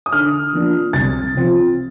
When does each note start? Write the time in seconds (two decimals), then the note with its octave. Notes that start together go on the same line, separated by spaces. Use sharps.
0.06 D#6
0.12 D3 F6
0.53 F3 A#3 D4 F4
0.93 C2 A6
1.35 C3 F3 C4 F4